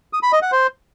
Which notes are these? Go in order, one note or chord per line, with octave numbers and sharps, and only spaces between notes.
D#6
B5
D#5
F#5
C5